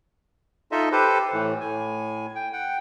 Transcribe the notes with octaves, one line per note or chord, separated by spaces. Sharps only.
D#4 F4 A4 D#5 E5
G4 A4 B4 C5
A2 E3
A2 G#5
G5
F#5 G5